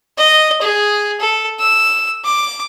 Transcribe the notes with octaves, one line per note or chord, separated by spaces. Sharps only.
D#5
G#4
A4
E6
D6